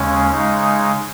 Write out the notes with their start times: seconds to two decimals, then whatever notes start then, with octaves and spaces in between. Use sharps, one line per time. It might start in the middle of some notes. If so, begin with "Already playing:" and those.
Already playing: D#2 C#3 G#3 C#4
0.31 C#3 G#3 D#4